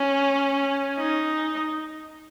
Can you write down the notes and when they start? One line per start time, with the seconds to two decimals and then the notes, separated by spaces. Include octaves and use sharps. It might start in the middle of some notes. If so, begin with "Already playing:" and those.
Already playing: C#4
0.98 D#4